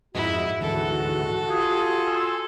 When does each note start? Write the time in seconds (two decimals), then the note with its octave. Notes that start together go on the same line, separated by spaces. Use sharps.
0.15 F2 G#2 E4 F#4 D#5
0.61 D2 G#2 E3 A4
1.49 F4 G4 G#4
2.07 G#5 C6 E6